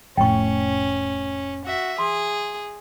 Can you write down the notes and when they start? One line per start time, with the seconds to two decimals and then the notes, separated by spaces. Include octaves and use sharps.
0.17 F1 A2 C#4 G5 C#6
1.65 F#4 E5
1.98 G#4 C6